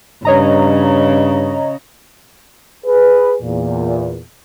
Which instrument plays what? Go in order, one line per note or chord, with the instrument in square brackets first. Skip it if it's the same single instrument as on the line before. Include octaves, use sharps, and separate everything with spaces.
[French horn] G2 [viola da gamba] C#3 [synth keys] C#5 D#5 A#5
[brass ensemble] G#4 B4
E2 A#2